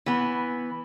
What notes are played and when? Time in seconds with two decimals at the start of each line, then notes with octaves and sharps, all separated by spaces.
0.06 E3 B3